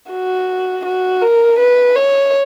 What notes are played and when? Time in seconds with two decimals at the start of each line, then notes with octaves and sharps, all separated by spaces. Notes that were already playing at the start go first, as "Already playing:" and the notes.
0.11 F#4
0.86 F#4
1.22 A#4
1.59 B4
1.96 C#5